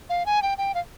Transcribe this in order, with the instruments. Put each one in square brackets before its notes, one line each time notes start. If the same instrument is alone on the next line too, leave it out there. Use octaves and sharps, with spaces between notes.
[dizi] F5
G#5
G5
G5
F5